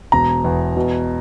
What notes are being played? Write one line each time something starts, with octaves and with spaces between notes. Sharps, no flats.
E1 A#5
E2
B2